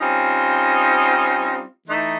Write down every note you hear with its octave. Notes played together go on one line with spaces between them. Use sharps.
G3 C4 C#4 D#4 F4
E3 A3 D#4